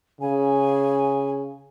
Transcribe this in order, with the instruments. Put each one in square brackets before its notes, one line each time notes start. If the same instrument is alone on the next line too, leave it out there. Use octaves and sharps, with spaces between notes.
[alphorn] C#3 [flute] G#5